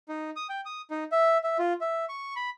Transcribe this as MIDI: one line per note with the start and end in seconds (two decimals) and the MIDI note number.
0.09 0.30 63
0.36 0.47 87
0.49 0.61 79
0.65 0.82 87
0.91 1.04 63
1.12 1.38 76
1.43 1.57 76
1.59 1.73 65
1.81 2.05 76
2.09 2.34 85
2.36 2.50 83